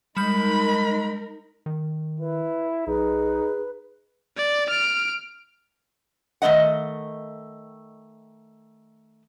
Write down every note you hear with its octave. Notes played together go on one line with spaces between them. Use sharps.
G3 G#3 D#4 A#4 B5 G6
D#3
E4 B4
B1 D#4 G#4 B4
D5
F6 D7
D#3 A3 D#4 D#5 F#5